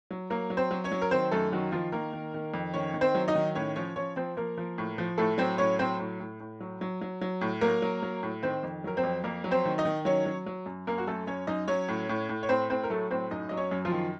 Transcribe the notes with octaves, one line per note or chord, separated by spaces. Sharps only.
F#3
F#3 A#3 A#4
F#3
C4 C5
F#3
C#4 C#5
F#3
A#4
D#3 C4 C5
F#2 A3 A4
D#3 F#3 F#4
D#3 F3 F4
D#3 A#3 A#4
D#3
D#3
F2
D#3 C#4 C#5
D#3
C4 C5
F#3
D#4 D#5
D#3
A2 C#4 C#5
F3 C#4 C#5
F3 C#4 C#5
F3 C4 C5
F3 A#3 A#4
F3
A2
F3
A2 A3 A4
F#3 C4 C5
A2 C#4 C#5
F#3 C4 C5
A2
A2
A2
F#3
F#3
F#3
F#3
A2
F#3 A#3 A#4
F#3
F#3
A2
D#3 C4 C5
F2
F#3 A#4
C4 C5
F2
F2 A#3 A#4
F#3
C4 C5
D#3
D#4 D#5
D#3
F#3 C#4 C#5
F#3
F#3
F#2
F#2 A#3 A#4
F#4
F#2 A3 A4
F#2 C#4 C#5
F#2 D#4 D#5
F#3 C#4 C#5
A2
A2
A2
C#5
A2 C4 C5
A2 C4 C5
A#4
F#3 A3 A4
A2 C4 C5
F#2 D#4 D#5
F#3 D#5
C#4 C#5
F#2
F3 F4
D#3